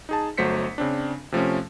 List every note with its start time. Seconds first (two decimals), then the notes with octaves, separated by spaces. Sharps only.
0.09 D#4 G#4 A5
0.37 G1 F#3 A3 C5 B6 C#7
0.78 C#3 C4 D4
1.32 C3 F3 A3 C#4